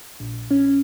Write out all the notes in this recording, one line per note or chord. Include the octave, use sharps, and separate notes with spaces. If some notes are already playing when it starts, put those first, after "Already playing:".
A#1
C#4